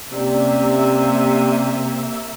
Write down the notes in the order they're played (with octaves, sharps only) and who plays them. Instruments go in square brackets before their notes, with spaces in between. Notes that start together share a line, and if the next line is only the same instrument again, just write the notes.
[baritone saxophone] C3 [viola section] A#3 E5 [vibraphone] C#4 G4 D5